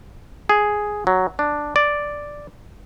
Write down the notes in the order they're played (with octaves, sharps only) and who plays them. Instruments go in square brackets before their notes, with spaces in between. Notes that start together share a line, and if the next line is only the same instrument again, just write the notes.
[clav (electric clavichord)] G#4
F#3
D4
D5